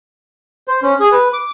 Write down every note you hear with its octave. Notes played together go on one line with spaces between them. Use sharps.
C5
C#4
G#4
B4
D6